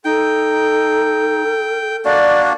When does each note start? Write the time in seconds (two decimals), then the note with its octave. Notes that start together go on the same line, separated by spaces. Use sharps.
0.05 D#4 A4 G5
2.05 A#3 D4 F#4 D5